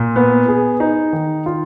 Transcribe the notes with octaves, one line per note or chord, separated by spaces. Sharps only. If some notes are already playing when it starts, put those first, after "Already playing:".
Already playing: A#2
B3
G#4
D#4
D#3
F4